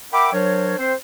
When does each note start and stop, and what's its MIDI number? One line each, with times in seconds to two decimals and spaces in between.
0.13 0.33 70
0.13 0.33 76
0.13 0.33 78
0.13 0.33 79
0.13 0.33 83
0.13 0.33 86
0.33 0.76 54
0.33 0.76 62
0.33 0.76 70
0.33 0.76 72
0.33 0.76 73
0.78 0.94 60
0.78 0.94 72